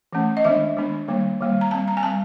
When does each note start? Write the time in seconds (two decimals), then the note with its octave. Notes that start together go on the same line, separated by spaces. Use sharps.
0.13 E3 A3 C#4
0.37 D#5
0.44 D#3 G#3 B3 D4 E5
0.76 D#3 G#3 B3 D4
1.08 D#3 G3 A#3
1.40 D#3 G3 A#3
1.61 A#5
1.71 G3 C4 A5
1.88 A#5
1.97 G#5
2.03 G3 C4 A5